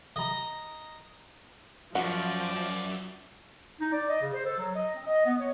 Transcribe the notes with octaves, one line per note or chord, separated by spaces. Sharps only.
D#5 A#5
F#2 F3 F#4 D5
D#4
D5
D#5
C#3
C5
A4
F#3
D#5
C4
D#5
B3
C#5